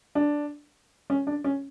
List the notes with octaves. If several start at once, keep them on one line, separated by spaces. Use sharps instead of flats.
D4
C#4
D4
C#4